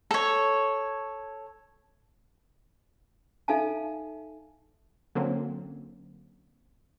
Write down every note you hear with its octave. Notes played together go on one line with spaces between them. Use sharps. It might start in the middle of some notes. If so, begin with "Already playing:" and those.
A4 C#5
D#4 A4 E5 F5 G#5 A5
D3 F#3 A#3 C4 C#4